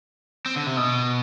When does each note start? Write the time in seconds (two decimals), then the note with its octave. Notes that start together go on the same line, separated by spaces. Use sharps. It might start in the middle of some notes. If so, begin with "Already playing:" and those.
0.46 C4
0.56 D3
0.66 C3
0.77 B2